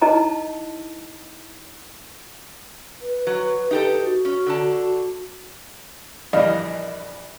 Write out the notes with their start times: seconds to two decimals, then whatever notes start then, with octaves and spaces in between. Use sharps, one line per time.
0.02 D#4 E4 D#5 A5 A#5
3.01 B4
3.27 F#3
3.71 D#4 G4 A4
4.04 F#4
4.25 C#4
4.47 D3 A5
6.33 A#1 E2 G3 D#5 F5